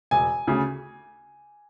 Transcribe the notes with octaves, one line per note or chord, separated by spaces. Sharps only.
E1 G#5
D2 C#3